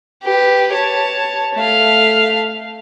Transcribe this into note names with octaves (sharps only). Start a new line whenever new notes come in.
G4 B4
C#5 A5
A3 F5